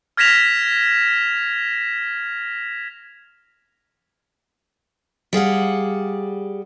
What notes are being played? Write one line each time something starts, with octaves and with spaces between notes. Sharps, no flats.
F6 G#6 A#6 B6 E7 F7
G3 G#4 F5 F#5